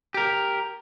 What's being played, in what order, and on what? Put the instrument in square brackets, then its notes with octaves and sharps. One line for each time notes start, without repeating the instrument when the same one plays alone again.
[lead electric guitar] G4 A#4